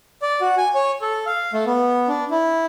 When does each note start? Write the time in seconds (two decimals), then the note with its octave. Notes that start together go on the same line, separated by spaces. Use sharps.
0.22 D5
0.41 F#4
0.58 G#5
0.75 C#5
1.01 A4
1.26 F5
1.53 A3
1.66 B3
2.08 D4
2.31 E4